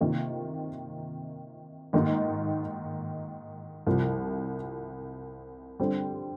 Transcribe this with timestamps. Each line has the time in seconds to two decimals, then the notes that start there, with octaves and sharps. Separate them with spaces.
0.01 C3 D#3 A#3 F4
1.93 G#2 D#3 A#3 D#4
3.87 C2 C3 F3
5.80 D3 G3 C4